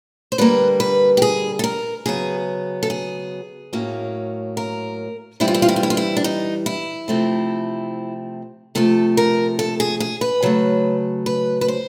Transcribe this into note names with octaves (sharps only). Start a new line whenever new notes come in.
C5
D3 G3 A#3 B4
B4
G4
G#4
A4
A#4
C#3 F#3 B3 G#4
A4
G#4
A2 F#3 A#3 C#4
A#4
E3 G3 C4 E4
F4
E4
F4
E4
F4
E4
F4
E4
D4
D#4
E4
C3 F3 A3 C4
C3 F3 A3 A4
A#4
A4
G#4
G#4
B4
C#3 F#3 A3
B4
B4
C5